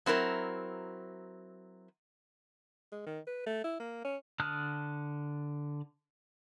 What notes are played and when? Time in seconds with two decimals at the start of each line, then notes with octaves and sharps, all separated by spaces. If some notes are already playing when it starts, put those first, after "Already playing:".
0.06 F#3 C4 E4 A#4
2.92 G#3
3.06 D#3
3.27 B4
3.46 A3
3.64 E4
3.80 A#3
4.05 C#4
4.40 D3 A5 D#6 F6 F#6